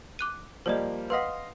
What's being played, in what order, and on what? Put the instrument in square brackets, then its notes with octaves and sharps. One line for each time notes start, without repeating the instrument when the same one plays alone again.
[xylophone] D6 F#6 D#7
[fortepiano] F3 G3 A#3 [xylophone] C5 D5 D#5
[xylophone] B4 F#5 [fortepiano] D#5 F5 C6